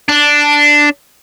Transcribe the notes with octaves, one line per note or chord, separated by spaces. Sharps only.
D4